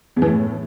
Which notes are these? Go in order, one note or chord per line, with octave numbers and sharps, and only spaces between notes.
E2
E3
A2